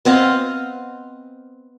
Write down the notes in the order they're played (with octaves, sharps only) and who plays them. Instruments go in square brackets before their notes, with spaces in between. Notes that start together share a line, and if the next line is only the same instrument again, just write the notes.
[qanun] B3 C4 D#5 F5